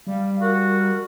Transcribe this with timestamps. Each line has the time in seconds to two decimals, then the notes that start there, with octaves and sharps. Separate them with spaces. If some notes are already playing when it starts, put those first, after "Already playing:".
0.07 G3 F5
0.41 F#4 A#4